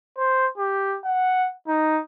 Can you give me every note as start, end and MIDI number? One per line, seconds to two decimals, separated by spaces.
0.17 0.47 72
0.58 0.98 67
1.05 1.50 78
1.68 2.00 63